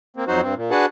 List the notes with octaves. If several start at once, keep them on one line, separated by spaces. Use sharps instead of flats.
A#3 C4
F2 F#3 D#4 F#4 C5
G2 C4
A#2
D4 F#4 G#4 B4 F#5 A5